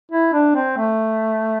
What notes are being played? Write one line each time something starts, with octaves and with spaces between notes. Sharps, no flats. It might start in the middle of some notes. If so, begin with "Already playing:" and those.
E4
D4
C4
A3